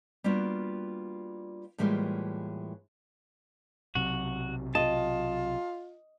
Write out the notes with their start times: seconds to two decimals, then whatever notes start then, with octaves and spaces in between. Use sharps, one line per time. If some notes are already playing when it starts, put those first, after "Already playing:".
0.24 G3 A#3 B3 D4 F4 F#4
1.78 A2 E3 G3 G#3 A#3 F4
3.95 B1 C3 F#3 F#4
4.75 F4 D#5 A5